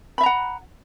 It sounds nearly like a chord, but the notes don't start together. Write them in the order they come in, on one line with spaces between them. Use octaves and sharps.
B5 E5 A#5 F#5